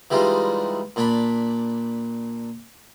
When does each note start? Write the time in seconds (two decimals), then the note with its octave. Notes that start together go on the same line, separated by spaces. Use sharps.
0.11 E3 G3 G#3 D#4 F4
0.96 A#2 D4 B5